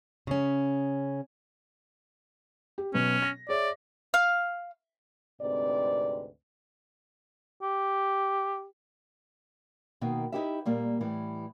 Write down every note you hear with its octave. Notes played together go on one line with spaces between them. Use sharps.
C#3 C#4
G4
B2 F#3 B3 C#4
A#6
G#4 C#5 D5 E5
F5
D2 G#2 C3 C4 B4 D5
G4
B2 D#3 A#3
D#4 E4 F#4 G4 B4 E5
A#2 G3 A#3
A2 E3 G3